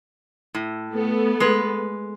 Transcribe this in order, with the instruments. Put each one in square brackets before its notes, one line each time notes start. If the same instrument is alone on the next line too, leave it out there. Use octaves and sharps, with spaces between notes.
[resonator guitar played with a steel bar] A2
[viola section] A3 B3 A4
[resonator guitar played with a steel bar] G#3 B4